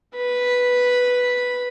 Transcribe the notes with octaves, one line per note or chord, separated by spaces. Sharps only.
B4 B5